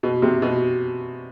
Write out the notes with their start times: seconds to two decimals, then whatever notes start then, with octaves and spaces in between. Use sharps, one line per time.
0.03 B2
0.22 C3
0.42 B2